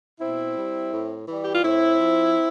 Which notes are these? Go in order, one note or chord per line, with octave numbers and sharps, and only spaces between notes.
B2 C4 E4
G3
A2
E3 G3
G4
F4
A2 C4 E4
F3